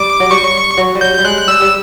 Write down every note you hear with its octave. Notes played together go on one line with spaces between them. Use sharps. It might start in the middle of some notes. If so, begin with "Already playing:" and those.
Already playing: G3 D6
F#3
G3 C#6
F#3
G3
F#3 G6
G3
G#3 F#6
G3 E6
G3